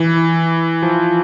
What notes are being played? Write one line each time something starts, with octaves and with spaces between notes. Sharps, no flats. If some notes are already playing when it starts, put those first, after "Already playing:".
Already playing: E3
F3